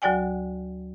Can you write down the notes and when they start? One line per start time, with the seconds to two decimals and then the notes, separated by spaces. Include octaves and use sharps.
0.02 D2 F#3 F#4 D5 G5 G#5